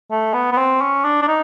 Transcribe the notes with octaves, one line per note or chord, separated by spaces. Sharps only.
A3
B3
B3
C4
C#4
D4
D4
D#4